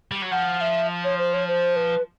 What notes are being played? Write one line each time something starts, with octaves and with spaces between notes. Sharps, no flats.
G3
F#3
F3 F#5
E5
C#5
C5
C#5
C5
B4